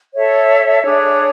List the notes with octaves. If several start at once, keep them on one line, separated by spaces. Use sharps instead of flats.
A4 C#5 E5
D4 G#4 C#5